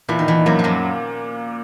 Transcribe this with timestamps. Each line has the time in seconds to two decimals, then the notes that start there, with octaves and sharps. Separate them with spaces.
0.09 E2 A#2 E3
0.19 D#3
0.28 E2 E3
0.46 F#2 F#3 A#3
0.59 F3
0.64 F#2 F#3